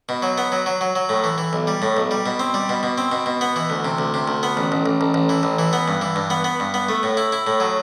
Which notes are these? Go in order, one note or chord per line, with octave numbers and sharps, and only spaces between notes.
B2
F#3
B3
F#3
F#3
F#3
F#3
A2
E3
E3
B1
G3
A2
B1
G3
B2
C4
G3
B2
B2
C4
B2
B2
B3
E3
D2
C3
D2
C3
D2
B3
A1
A1
A1
A1
A1
E3
A1
E3
B3
G2
E3
G2
B3
B3
G2
B3
A3
A2
E4
E4
A2
F#3